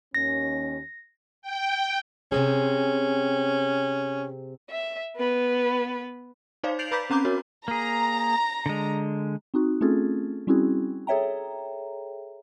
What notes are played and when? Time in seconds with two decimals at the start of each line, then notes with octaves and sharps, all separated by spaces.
0.15 D#2 C#4 A#6
1.42 G5
2.32 C3 C4 C#4 G#4
4.70 E5
5.17 B3 B4
6.63 D#4 C5 D5 F5
6.79 G6 A6 C7 D7 F7 F#7
6.91 B4 A#5 B5 D6 G6 B6
7.10 C4 C#4 A#5 D6 G6
7.25 C#4 F#4 A#4 C#5
7.68 A#3 G#4 A#5
8.66 D3 G#3
9.54 C4 D#4 F#4
9.81 A3 C4 C#4 F4 G#4 A4
10.47 G3 C4 C#4 E4 F#4 G#4
11.07 G#4 A4 C#5 E5 G5 A#5